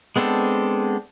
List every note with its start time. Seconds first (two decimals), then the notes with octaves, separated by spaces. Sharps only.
0.16 G#3 B3 C4 D4 A4